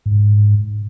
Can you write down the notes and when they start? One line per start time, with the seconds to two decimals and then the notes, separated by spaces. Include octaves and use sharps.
0.06 G#2